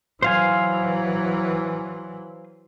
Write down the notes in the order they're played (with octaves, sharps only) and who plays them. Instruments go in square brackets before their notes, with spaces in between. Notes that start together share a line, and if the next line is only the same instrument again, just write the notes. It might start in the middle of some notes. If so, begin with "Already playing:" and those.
[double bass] E3 F#3 [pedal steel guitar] C5 F5 G#5